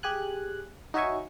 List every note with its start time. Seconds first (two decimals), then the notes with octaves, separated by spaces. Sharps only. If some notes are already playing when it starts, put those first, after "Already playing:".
0.03 G4 G#4 G#5 F#6
0.94 D#4 F#4 C#5 E5 G#5 C#6